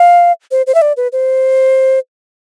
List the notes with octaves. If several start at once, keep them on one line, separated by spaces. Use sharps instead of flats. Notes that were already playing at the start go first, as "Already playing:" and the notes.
Already playing: F5
C5
C5
E5
D5
B4
C5